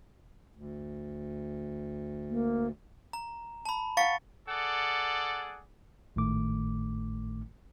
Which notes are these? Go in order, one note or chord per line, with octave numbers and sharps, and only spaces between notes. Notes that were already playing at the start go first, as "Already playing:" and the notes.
D2
A#3
A#5
A5 B5
F5 F#5 C#6 A6 C#7
G#4 A4 D5 F#5
G#1 A2 D#3 A3 D6